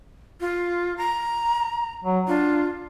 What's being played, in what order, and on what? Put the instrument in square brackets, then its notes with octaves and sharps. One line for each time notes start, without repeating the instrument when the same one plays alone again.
[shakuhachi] F4
A#5
[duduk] F#3
[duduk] D4 [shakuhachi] F4